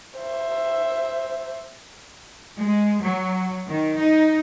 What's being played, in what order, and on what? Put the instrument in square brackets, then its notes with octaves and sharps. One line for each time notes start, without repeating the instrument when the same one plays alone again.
[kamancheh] C5 E5
[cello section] G#3
F#3
D#3
D#4